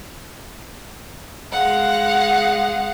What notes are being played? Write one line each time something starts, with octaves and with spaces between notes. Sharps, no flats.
G#3 F5 F#5